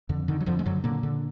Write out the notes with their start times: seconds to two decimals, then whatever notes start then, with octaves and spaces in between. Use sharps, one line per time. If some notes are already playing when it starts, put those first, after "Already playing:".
0.09 F2 D3
0.28 D3 D#3
0.41 F#3
0.46 F2 D3 F3
0.59 G#3
0.66 F#2 D3 F#3
0.84 A#2 D3 A#3
1.03 D3